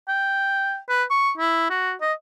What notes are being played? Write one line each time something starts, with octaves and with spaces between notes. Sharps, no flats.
G5
B4
C#6
E4
F#4
D#5